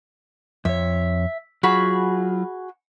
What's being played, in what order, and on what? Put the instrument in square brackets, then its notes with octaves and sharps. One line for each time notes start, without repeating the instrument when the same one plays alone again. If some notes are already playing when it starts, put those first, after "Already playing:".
[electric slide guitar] F2 C#5 [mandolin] E5
[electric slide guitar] F#3 F4 [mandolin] F#4 G#4 B5